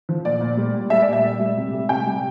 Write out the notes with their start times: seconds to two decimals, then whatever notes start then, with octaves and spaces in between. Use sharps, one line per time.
0.09 F3
0.25 A#2 D5
0.41 A#2
0.57 G3
0.74 A#2
0.90 G3 E5
1.02 D5
1.08 A#2 E5
1.23 G3
1.40 G3
1.57 C3
1.73 G3
1.89 C3 G5
2.07 G3